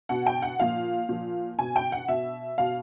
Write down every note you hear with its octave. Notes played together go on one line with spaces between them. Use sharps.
B2 F#5
G5
F#5
A#2 F3 F5
A#2 F3
B2 G#5
G5
F#5
B2 E5
B2 F5